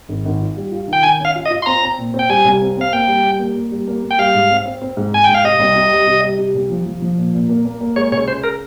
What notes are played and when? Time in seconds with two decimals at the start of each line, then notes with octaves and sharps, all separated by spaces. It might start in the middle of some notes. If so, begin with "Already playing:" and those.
0.09 G#1
0.25 G#1
0.41 F4
0.57 G3
0.72 F4
0.88 D#3
0.93 G5
1.03 D#3 G#5
1.20 C#4
1.25 F5
1.36 F4
1.46 D#5
1.51 F4
1.62 C6
1.66 C4 A#5
1.83 C4
1.98 A#2
2.14 C4
2.19 G5
2.29 G3 G#5
2.45 C2
2.62 C4
2.77 C4 F5
2.93 A#3 G5
3.08 G3
3.24 G3
3.39 A#3
3.55 A#3
3.71 G3
3.87 A#3
4.02 A#3
4.11 G5
4.18 G3 F5
4.34 G#2
4.51 C4
4.66 C4
4.82 C4
4.97 G#2
5.13 G#2 G#5
5.24 G5
5.29 G#2
5.34 F5
5.44 C3 D#5
5.60 C2
5.76 C3
5.92 G3
6.07 C3
6.23 G3
6.39 C3
6.55 C2
6.70 F3
6.86 F3
7.02 F3
7.18 A#2
7.34 A#2
7.49 A#3
7.65 A#3
7.81 A#3
7.96 G#3 C#5
8.12 C#2 C#5
8.28 C#3 C5
8.44 A#4